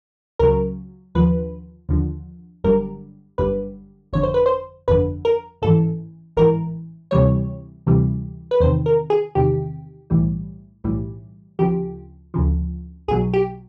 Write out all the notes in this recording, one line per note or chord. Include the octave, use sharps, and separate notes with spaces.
C#2 C#3 F#3 A#4
D#2 D3 F3 B4
D#2 D3 F3
G1 F#2 D3 G3 A#4
G1 F#2 D3 G3 B4
G1 F2 D3 C#5
C5
B4
C5
G1 F2 D3 B4
A#4
A1 G#2 E3 A4
A1 G#2 E3 A#4
D2 C3 E3 G3 C#5
D2 C3 E3 G3
B4
E2 C3 D#3 C5
A#4
G#4
E2 C3 D#3 G4
B1 A2 E3 G3
B1 A2 E3 G3
D2 C#3 F3 G4
D2 C#3 F3
B1 B2 F#3 G#4
G4